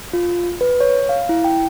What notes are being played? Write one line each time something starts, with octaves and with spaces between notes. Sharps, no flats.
F4
B4
C#5
F5
E4
G5